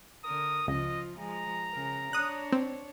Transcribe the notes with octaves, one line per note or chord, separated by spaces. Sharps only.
D3 A#4 D#6
C#2 F3 F4 D#5
F3 G#3 A#5
C#3 A#4
D4 C#5 D#6 F#6
C4